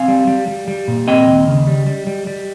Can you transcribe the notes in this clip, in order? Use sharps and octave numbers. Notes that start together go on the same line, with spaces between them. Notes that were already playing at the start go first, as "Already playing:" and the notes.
Already playing: C4 F5 G#5
G3
G3
G3
G3
A#2
C4 D#5 G5
D#2
C#3
G3
G3
G3
G3